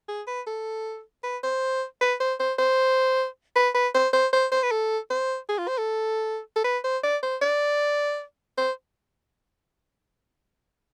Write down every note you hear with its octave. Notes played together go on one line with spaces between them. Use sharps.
G#4
B4
A4
B4
C5
B4
C5
C5
C5
B4
B4
C5
C5
C5
C5
B4
A4
C5
G#4
F4
C5
A4
A4
B4
C5
D5
C5
D5
C5